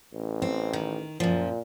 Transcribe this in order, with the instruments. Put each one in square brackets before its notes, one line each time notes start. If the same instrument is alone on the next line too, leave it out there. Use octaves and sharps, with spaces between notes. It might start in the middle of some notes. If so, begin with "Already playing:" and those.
[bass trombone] A1
[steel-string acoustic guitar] C4
D#3
[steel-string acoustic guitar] F#2 F3 [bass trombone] A#2